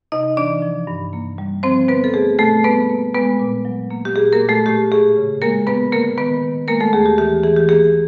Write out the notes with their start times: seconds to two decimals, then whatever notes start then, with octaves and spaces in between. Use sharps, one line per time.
0.12 C3 D#4 D#5
0.37 E3 D4 D5
0.62 F3
0.87 G2
1.13 A#3
1.38 G3
1.63 F3 C4 C5
1.88 D3 B3 B4
2.04 A4
2.14 A3 G#4
2.39 B2 A3 A4
2.64 G3 B3 B4
2.90 A#3
3.14 G#3 B3 B4
3.39 A#2
3.65 F#3
3.90 A#3
4.05 G4
4.16 A#2 G#4
4.32 A#3 A#4
4.41 A#2
4.49 A3 A4
4.66 A2 G4
4.91 A2 G#4
5.17 C#3
5.42 G#3 A#3 A#4
5.67 A#3 B3 B4
5.92 D3 A#3 A#4
6.17 D#3 B3 B4
6.43 D#3
6.68 G#3 A#3 A#4
6.80 A3 A4
6.93 D#2 G#4
7.06 G4
7.18 E3 G4
7.44 E3 G#4
7.56 G4
7.69 A#3 G#4